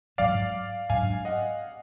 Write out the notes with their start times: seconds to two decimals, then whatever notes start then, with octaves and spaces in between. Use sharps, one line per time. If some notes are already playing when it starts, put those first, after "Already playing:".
0.18 G#2 F#3 D4 D5 F5
0.90 G#2 F#3 D4 F5 G#5
1.25 D#5 F#5